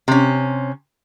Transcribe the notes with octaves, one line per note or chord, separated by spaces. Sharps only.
C3 C#4